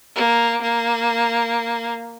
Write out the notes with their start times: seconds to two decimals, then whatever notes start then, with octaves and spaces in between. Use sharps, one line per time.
0.16 A#3
0.62 A#3